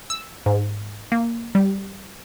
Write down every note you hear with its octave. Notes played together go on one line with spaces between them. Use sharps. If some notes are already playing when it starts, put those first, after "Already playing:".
E6
G#2
A#3
G3